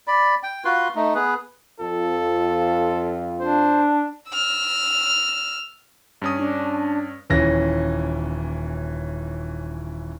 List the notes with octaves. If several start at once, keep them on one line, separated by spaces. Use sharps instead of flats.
D5 B5
G5
F4 F#4 B4 C6
A3 D#4
B3 G#4 B4
F2 F4 A4
D4 C5
E6 F6
G2 C#4 D#6
D4
D#1 E3 C#4 A#6